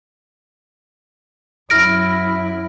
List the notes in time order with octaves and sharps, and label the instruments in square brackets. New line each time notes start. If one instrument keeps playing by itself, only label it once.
[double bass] F#2 E4 [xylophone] F6 A#6 D7